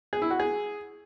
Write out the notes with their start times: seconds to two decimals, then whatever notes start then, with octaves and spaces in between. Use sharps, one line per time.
0.13 G#4
0.22 E4
0.31 F#4
0.40 G#4